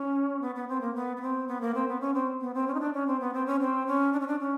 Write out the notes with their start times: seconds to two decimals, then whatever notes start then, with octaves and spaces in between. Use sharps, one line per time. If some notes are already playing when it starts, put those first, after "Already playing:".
Already playing: C#4
0.42 B3
0.55 B3
0.68 C4
0.81 A#3
0.95 B3
1.17 B3
1.22 C4
1.48 B3
1.61 A#3
1.74 C4
1.88 B3
2.01 C#4
2.14 C4
2.41 B3
2.54 C4
2.67 C#4
2.75 D#4
2.80 D4
2.93 C#4
3.07 C4
3.20 B3
3.34 C4
3.46 C#4
3.60 C4
3.87 C#4
4.13 D4
4.20 C#4
4.28 D4
4.40 C#4